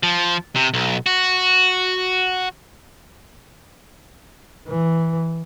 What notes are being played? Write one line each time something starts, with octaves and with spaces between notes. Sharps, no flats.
F3
C3
B1
F#4
E3